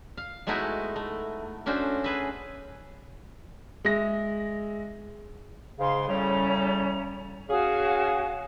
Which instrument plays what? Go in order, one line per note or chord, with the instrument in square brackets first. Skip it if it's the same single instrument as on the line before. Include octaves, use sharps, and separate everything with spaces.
[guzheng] F5
G#3 A3 B3 D#4 E4 F#4
A3
A3 C#4 D4 F#4 C5
G#4 B4 E5
[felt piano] G#3 E5 A#6
[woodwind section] G#2 C#3 [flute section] G#4 F5 C6
[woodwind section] A2 C#3 G3 [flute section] C#4 A#5
[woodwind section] C#4 G#4 [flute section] F#4 F5 G#5